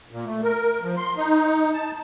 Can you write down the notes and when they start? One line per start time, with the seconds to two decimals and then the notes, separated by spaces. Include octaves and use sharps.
0.11 A#2
0.26 A3
0.43 A#4
0.82 F3
0.97 C6
1.16 D#4
1.74 A5